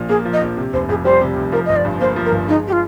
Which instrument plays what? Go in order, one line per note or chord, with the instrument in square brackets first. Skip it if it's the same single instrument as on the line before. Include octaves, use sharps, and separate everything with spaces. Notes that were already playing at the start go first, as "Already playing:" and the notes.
Already playing: [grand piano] A#1 A#2 F3
[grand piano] A#3 [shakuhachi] G#4
[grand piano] F3
[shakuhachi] D#5
[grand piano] A#1
C3
[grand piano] F1 [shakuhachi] C5
[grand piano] F2 [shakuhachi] G#4
[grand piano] G3 [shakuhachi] C5
[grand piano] C3
F1
[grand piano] F3 [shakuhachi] A#4
[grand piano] G1 [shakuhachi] D#5
[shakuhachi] D5
[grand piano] G2
[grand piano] A#3 [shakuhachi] C5
[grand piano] F3
[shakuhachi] A#4
[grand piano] G1
[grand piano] G#3 [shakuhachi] D#4
[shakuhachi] G4
F4